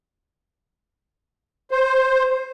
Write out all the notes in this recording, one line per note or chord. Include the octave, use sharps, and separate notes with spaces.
C5